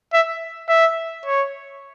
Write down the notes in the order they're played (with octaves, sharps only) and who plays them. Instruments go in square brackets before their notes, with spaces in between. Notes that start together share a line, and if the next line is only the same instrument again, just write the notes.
[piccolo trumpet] E5
E5
C#5